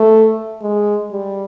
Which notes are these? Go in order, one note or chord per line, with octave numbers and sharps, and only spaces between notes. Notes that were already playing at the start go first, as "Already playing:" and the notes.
Already playing: A3
G#3
G3